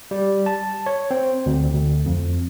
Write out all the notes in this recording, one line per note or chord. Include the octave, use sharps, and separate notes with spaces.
G3
A5
C#5
C4
D2
D2
F2